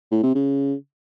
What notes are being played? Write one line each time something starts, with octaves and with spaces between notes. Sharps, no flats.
A2
C3
C#3